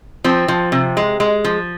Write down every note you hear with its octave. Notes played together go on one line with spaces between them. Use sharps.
F3 C4
F3
C3
G#3
G#3
F3